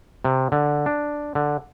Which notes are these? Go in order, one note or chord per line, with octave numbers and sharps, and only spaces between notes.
C3
D3
D4
D3